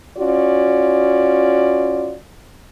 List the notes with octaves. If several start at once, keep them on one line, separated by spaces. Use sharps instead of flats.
C#4 F4 F#4 D5